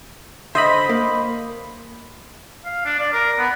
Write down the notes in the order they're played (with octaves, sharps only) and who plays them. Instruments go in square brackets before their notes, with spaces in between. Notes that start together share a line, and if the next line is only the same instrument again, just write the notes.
[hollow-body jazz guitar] D3 E5 [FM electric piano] C5 D#5 B5
[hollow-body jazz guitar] A#3
[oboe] F5
D4
D5
A#4
B3